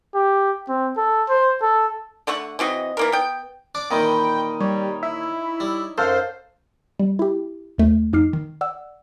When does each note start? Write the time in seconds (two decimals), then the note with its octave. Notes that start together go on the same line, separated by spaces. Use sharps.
0.15 G4
0.69 C4
0.97 A4
1.30 C5
1.62 A4
2.27 D3 A3 F#5 C#6
2.59 E3 C4 F#4 D#5
2.97 E3 A#3 A#4
3.12 B3 G5
3.75 D4 D6
3.91 A#2 D#3 E3 D#4 D#5 G5 B5
4.60 G3 C#5
5.03 E4
5.60 G3
5.98 F#2 A4 C5 F5 F#5
6.99 G3
7.19 E4 G4
7.78 D#2 A3
8.13 F2 D#4 D6 F6 C7
8.33 D#3
8.61 D5 F#5 E6